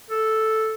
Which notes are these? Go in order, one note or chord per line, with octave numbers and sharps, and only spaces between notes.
A4